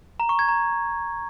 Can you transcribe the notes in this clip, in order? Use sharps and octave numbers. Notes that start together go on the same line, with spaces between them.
A#5
C#6
G#6
A#5